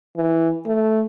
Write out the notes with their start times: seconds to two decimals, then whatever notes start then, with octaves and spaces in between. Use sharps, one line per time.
0.16 E3
0.66 A3